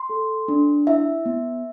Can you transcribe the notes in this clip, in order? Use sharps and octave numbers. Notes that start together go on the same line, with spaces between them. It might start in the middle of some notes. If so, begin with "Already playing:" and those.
Already playing: C6
A4
D4
E4 E5
B3